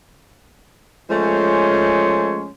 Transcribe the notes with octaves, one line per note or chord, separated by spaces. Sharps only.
F3 G#3 A3 C#4 C#5 C6